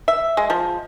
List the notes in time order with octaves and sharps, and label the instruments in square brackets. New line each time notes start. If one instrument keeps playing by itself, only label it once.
[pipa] E5
G#3
F3